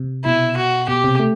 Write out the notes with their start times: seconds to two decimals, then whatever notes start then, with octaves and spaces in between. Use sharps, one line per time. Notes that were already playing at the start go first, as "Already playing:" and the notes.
Already playing: C3
0.25 B2 E4
0.57 F#4
0.88 B2 G4
1.04 C3
1.20 A3